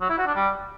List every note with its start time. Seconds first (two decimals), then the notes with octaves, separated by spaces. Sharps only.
0.01 F#3
0.09 E4
0.18 F#4
0.27 D4
0.35 G3